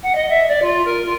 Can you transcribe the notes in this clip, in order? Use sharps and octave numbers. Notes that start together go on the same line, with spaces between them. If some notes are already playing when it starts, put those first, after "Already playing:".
F#5
D#5
E5
D5
F4
A#4
F4